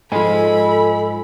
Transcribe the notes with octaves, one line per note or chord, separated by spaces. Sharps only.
G#2 F3 A4 D#5 G#5 B5